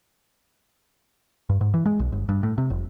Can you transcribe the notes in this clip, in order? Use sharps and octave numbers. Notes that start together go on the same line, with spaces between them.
G2
G#2
E3
G#3
B1
G1
G2
A2
C3
F1